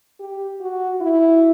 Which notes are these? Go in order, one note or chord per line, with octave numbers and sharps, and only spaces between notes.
G4
F#4
E4